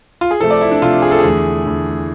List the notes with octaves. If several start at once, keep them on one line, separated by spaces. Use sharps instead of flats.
F4
G#4
C3 F3 A3 A4
D5
E4
D4
C3 F3 A3 F4
G#4
A4
G#4
E2 D3 A3
E2 D3 A3